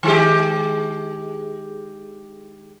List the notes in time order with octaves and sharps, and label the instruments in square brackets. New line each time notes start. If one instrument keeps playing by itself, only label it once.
[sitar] D#3 G#3 G4